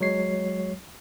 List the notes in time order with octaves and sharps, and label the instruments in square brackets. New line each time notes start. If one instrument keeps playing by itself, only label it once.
[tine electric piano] F#3 G#3 C#5 C7